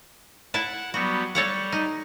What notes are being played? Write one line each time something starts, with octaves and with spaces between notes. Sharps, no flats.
E4 E5 F#5 A5
F#3 G3 B3 F#4
G3 A4 C#5 F#5
D#4